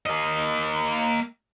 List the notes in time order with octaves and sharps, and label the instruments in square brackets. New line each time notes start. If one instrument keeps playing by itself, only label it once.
[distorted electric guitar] A#3 D#5